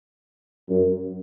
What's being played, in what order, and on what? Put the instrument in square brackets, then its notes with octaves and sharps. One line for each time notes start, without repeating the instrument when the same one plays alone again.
[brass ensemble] F#2